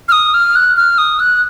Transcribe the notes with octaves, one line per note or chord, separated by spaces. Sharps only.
F6
D#6
F6
F#6
F6
D#6
F#6